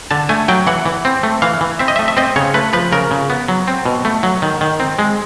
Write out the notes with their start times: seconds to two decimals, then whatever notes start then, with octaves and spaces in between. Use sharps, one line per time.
0.11 D3 A5
0.29 A3 G#5
0.48 F#3 G5
0.67 E3 F#5
0.86 E3
1.05 C4
1.23 A3
1.42 E3 F5
1.61 E3
1.79 C4 E5
1.88 D#5
1.96 E5
1.99 A3
2.08 E5
2.17 C4 D#5
2.36 C#3 C#5
2.54 A3 B4
2.73 F3 B4
2.92 C#3 A#4
3.11 C#3
3.30 B3
3.48 F#3
3.68 C4
3.86 B2
4.05 A3
4.23 F#3
4.42 D#3
4.61 D#3
4.80 C4
4.99 G#3